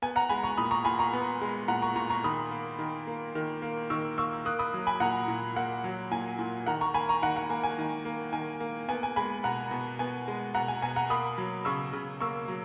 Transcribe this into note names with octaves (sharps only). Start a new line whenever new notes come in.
B3 G#5
F#5 A#5
G#3 G#5 B5
A#5 C#6
A#2 B5 D#6
A#5 C#6
A#2 G#5 B5
A#5 C#6
B3
G#3
A#2 F#5 A#5
A#5 C#6
A#2 A#5 C#6
A#5 C#6
D#3 B5 D#6
A#3
D#3
A#3
D#3
A#3
D#3 C#6 E6
A#3 C#6 E6
A#3 D#6 F#6
B5 D#6
F#3
G#5 B5
A#2 F#5 A#5
A#2
A#3 F#5
F#3
A#2 G#5
A#2
D#3 F#5 A#5
A#5 C#6
A#3 G#5 B5
A#5 C#6
D#3 F#5 A#5
F#5
A#3 G#5
G#5
D#3
A#3
D#3 G#5
A#3
B3 G#5
G#5
G#3 G#5 B5
B2 F#5 A#5
B2
B3 G#5
G#3
B2 F#5 A#5
G#5
B2 G#5
F#5 A#5
A#3 B5 D#6
F#3
C#3 C#6 E6
C#3
A#3 C#6 E6
F#3